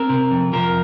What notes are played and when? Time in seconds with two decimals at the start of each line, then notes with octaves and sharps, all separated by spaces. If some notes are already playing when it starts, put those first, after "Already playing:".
Already playing: C4 A#4
0.10 C3
0.31 F2
0.53 F3 A#4